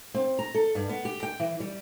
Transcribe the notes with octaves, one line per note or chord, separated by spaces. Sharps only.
C4
A#5
A4
G2
B3
G4
G5
E3
G3